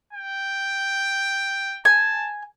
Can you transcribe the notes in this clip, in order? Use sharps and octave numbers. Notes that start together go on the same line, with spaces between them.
G5
G#5 A5